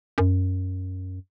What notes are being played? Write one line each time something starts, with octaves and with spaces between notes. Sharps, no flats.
F#2